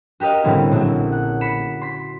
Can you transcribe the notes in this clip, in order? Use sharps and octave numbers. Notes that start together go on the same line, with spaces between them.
F#4 G4 A#4 D#5 F5
A2 D3 G3 C4 C#4 E4
A#1 F#3 E5
F#5
B5 B6 C#7 E7
C6 B6